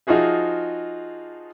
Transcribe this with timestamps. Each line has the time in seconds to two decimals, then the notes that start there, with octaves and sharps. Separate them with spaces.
0.07 F3 D#4 F4 F#4 G#4 E5